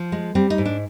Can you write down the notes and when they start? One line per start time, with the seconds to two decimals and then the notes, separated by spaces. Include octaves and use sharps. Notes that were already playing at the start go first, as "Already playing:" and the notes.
Already playing: F3
0.12 G#3
0.35 G3 C4
0.50 D#4
0.58 G#2
0.65 D4